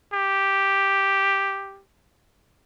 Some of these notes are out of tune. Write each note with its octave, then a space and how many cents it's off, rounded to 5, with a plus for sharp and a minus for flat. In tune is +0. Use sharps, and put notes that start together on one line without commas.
G4 +0